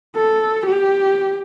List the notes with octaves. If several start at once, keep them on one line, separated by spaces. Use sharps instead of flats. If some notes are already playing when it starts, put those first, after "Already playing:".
A4
G4